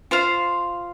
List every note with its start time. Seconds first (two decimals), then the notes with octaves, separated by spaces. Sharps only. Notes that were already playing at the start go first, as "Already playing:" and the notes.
0.11 F4 C5 F5